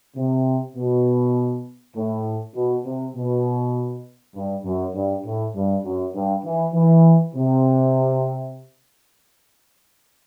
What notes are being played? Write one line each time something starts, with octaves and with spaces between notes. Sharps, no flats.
C3
B2
A2
B2
C3
B2
G2
F#2
G2
A2
G2
F#2
G2
E3
E3
C3